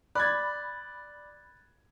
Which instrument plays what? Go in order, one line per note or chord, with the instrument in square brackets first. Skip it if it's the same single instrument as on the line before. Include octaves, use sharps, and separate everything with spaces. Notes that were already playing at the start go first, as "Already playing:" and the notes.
[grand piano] D5 G#6 [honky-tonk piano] B5 [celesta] F#6 A6